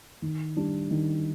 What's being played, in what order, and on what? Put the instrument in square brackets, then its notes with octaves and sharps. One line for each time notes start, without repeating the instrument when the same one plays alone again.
[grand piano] D#3
G3 D4
D#3